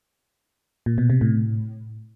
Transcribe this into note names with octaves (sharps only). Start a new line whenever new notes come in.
A#2
B2
C3
A2